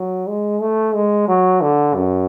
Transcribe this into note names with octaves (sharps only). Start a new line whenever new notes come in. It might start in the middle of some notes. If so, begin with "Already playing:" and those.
Already playing: F#3
G#3
A3
G#3
F#3
D3
F#2